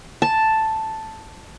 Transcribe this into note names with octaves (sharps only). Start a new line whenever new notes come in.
A5